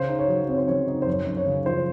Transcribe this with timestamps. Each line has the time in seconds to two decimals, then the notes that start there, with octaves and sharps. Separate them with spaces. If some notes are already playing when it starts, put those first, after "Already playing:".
Already playing: C#3 C5
0.08 D#4
0.19 C#5
0.28 F#3
0.49 C4 C#5
0.58 C5
0.68 C#3 C#5
0.88 D#4
1.02 C5
1.07 F#2 C#5
1.27 F#2
1.37 C#5
1.46 C#3
1.66 F3 C5